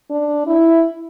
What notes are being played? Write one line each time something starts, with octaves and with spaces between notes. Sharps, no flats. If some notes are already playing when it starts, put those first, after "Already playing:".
D4
E4